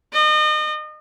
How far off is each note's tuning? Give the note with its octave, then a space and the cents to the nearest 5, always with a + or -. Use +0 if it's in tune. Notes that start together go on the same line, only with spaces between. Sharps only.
D#5 -35